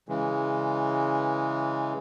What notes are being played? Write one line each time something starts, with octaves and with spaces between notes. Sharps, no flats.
C#3 E3 G#3